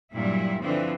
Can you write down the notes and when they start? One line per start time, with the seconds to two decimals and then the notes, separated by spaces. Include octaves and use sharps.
0.13 G2 A#2 F#3 G3 E4
0.60 D3 E3 F3 C4